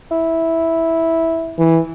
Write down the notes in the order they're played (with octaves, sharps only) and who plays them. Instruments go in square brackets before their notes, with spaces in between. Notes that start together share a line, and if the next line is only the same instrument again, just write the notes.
[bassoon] E4
[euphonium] E3